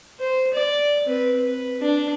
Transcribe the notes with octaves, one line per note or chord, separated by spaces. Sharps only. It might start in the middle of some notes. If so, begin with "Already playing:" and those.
C5
D5
C4 B4
B4
D4